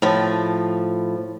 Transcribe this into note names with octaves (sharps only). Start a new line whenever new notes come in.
A2 F3